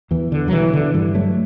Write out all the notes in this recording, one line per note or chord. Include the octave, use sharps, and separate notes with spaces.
E2 E3
D3
F#3
B2 E3
D3
G2 E3
F#3 A3